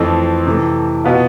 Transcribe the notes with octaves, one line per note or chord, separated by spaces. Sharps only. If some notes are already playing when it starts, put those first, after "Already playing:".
Already playing: F2 E3 A3 C4
C3 E3 A3
B2 B3 F4